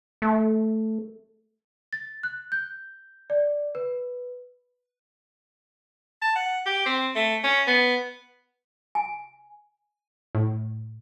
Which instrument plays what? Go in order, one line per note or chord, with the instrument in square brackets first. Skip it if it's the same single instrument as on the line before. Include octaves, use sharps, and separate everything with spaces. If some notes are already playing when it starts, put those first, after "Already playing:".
[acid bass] A3
[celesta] A6
F#6
G6
D5
B4
[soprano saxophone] A5
F#5
G4
C4
A3
C#4
B3
[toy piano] G#5
[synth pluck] A2